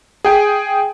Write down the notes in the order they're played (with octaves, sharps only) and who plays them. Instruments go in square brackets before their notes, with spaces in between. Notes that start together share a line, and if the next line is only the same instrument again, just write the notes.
[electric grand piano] G#4 G5 G#5